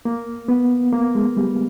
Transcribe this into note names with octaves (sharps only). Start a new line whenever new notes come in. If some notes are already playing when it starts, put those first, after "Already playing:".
A#3
B3
A#3
G#3
G3